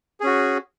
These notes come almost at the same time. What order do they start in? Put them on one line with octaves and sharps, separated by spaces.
G#4 C#4 F#4